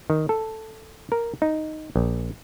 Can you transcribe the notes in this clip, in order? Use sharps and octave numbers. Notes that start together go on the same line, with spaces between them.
D#3
A4
A#4
D#4
A#1